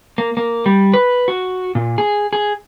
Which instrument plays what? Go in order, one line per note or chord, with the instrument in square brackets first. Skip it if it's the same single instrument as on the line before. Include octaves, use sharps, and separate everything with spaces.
[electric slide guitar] A#3
A#3
G3
B4
F#4
A#2
G#4
G#4